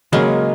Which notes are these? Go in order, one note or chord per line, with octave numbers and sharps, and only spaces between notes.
C#3 F#3 G#3 A#3 C#4